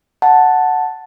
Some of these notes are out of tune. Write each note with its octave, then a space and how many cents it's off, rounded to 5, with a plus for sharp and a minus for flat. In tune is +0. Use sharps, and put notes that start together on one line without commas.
F#5 +0 A5 +0